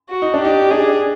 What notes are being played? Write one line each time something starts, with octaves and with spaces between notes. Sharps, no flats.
F#4
D#4
D4
D#4 G4
D4 G#4